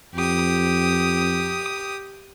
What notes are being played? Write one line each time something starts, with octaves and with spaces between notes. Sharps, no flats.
F2 G4 D#6